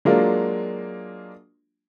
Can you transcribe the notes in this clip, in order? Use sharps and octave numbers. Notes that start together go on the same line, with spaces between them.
F#3 G#3 A#3 D4 F4